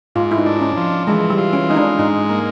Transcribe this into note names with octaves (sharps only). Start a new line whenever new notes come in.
G#2 F4
E4
D#4
D4
C#4
F3
E3 G#3
G3
F4
C#4
G#3 D#4
D4
G#2 D#4
A#3